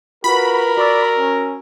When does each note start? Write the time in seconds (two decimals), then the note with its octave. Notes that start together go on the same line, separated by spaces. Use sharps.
0.24 F4 F#4 A#4 B4 B5
0.77 F#4 D5 C#6 E6
1.18 C#4